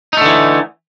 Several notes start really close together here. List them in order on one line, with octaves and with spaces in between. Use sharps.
D#4 A3 D3 E3